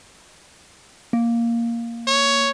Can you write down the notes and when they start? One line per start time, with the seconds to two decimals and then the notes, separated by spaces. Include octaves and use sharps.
1.13 A#3
2.07 C#5